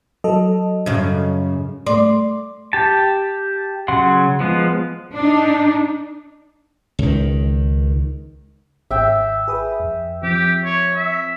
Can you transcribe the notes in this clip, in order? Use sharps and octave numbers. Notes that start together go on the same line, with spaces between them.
F#3 A4 D#5
F#2 C#3
A3 D5 C6
G4 A5
C#3 F#3 F#5 C6
F3 G#3 B3
D4 D#4
C#2 D#3
G#1 E5 G5
G#4 B4 D#6
F2
F3 C4 G4
C#5
E5